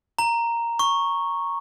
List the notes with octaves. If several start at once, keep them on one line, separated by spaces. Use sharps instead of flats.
A#5
C#6